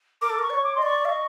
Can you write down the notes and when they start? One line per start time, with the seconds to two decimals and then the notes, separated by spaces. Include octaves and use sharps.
0.21 A#4 D6
0.30 A4
0.38 A#4 C#6
0.50 D5
0.54 C#5
0.63 D6
0.75 D#5 C6
0.82 D5 C#6
1.05 D#5 F5 C#6